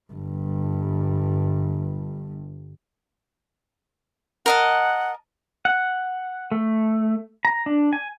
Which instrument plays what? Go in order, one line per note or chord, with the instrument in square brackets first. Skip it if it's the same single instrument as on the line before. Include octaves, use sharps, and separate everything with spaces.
[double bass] G1 G2
[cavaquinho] A#4 D#5 A5 [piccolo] F#5
[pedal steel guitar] F#5
A3
A#5
D4
G#5